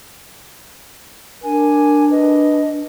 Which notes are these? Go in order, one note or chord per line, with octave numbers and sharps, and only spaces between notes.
D4 A#4 G#5
B4 D#5